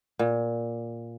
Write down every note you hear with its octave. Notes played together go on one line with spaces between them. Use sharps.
A#2